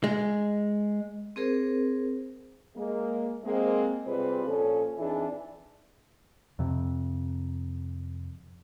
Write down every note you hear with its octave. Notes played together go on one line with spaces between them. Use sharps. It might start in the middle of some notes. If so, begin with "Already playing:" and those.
G#3
C4 G#4 A#4 C5
G#3 A#3
G#3 A#3 C4
C3 G3 F4 G#4 B4 C5
A#2 F3 C#4 A4
F2 E3 D4 D#4 G#4
F2 C3